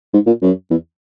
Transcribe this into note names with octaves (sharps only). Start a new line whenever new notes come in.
G#2
A#2
F#2
E2